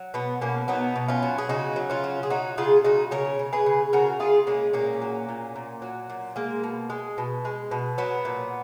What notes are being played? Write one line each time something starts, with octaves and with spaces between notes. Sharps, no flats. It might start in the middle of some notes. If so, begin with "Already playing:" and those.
Already playing: F#3
B2 B3
B2 A#3 C#4
F#3 B3 D#4
B2
C#4 F4
F#3
G#4
C#3 D#4 F#4
F#3
C#4 F4
F#3
G#4
F#3 D#4 F#4
C#3 F4 G#4
C#3 D#4 F#4
C#3 A#4 C#5
C#3
G#4 B4
C#3
C#3 F#4 A#4
C#3 F4 G#4
G#3 A#3 C#4
A#2 A#3 C#4
F#3
A#2
A#2
F#3
A#2
G#3 A#3
B2
G#3
B2
G#3
B2
F#3 B3
A#2